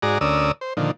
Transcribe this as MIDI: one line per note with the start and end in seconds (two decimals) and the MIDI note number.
0.02 0.18 44
0.02 0.18 66
0.02 0.18 68
0.02 0.18 74
0.02 0.18 82
0.21 0.52 38
0.21 0.52 61
0.21 0.52 70
0.21 0.52 74
0.21 0.52 87
0.21 0.52 88
0.61 0.74 72
0.77 0.91 46
0.77 0.91 50
0.77 0.91 51
0.77 0.91 53